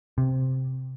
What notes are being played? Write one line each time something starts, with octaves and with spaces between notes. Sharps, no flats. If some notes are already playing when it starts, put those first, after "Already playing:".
C3